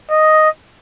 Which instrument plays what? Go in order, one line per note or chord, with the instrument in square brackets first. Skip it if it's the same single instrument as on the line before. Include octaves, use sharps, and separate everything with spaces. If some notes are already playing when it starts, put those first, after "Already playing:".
[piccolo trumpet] D#5